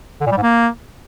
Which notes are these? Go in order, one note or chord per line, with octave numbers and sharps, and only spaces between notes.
D3
A#2
G3
G#2
A#3